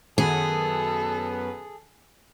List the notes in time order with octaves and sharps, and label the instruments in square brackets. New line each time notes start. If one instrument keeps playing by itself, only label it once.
[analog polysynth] F#2 B3 [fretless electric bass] D#3 C#4 [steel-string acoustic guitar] G#4 [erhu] A4